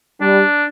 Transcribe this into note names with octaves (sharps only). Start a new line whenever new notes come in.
G3 D4